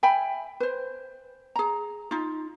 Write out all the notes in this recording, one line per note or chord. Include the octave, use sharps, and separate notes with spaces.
E5 G5 G#5 B5
B4 C5
G#4 A#5
D#4 F4